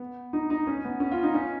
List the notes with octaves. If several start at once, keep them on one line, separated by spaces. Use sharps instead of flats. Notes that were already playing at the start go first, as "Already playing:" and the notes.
Already playing: B3
D#4
D#4
C#4
B3
C#4
F4
D#4
C#4